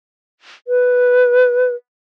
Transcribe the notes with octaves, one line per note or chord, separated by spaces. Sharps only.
B4